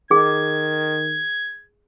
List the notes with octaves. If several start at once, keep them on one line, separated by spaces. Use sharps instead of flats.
D#3 G#4 G#6